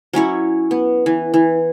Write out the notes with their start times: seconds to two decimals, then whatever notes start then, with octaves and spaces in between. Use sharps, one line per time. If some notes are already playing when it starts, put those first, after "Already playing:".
0.13 F#3 C#4 E4 C#5
0.71 B3
1.06 E3
1.34 E3